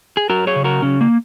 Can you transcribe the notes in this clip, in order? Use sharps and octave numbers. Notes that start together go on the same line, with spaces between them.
G#4
F#3 F#4 A#4
G#4 C#5
C#3
F#4 A#4
C#3 C#4
A#3